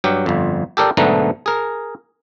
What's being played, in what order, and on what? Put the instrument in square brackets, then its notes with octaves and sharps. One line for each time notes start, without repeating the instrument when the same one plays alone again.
[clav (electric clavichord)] G2 F#3 G4
G1 F2
G4 A4 A#4 D5 G5
B1 G#2 D3 A3 B3 A#5
G#4 A#4